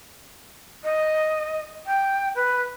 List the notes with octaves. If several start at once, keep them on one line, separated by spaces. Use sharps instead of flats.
D#5
G5
B4